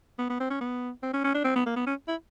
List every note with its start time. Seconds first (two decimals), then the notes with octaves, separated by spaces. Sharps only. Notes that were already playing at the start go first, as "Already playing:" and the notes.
0.18 B3
0.30 B3
0.40 C4
0.50 C#4
0.61 B3
1.03 C4
1.13 C#4
1.24 C#4
1.34 D4
1.44 C4
1.56 B3
1.66 A#3
1.76 B3
1.87 C#4
2.08 E4